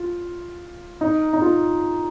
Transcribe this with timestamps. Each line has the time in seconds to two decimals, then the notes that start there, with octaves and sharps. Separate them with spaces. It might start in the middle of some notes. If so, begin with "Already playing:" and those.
Already playing: F4
1.01 D#4
1.33 D#4
1.42 F4